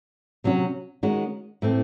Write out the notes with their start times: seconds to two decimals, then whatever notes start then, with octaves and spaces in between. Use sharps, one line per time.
0.44 C3 F#3 C#4 F#4
1.03 D#3 G#3 C#4 F#4
1.62 A2 E3 A3 C4